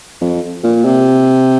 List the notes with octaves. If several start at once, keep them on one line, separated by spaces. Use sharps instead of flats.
F2
A#2
C3